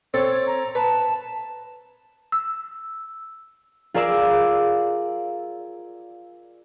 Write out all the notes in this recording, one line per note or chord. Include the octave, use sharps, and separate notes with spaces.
C4 A4 C#5
A#5
B4 A5
E6
F4 G#4 A#4 D5 D6 E6